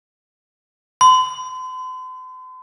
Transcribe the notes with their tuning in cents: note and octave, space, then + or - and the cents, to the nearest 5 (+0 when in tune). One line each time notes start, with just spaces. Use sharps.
C6 -45